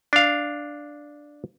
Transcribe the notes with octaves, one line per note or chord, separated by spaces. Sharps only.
D4 F5